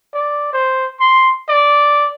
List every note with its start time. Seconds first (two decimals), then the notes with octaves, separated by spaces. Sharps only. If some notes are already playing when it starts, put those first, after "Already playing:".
0.13 D5
0.53 C5
1.00 C6
1.49 D5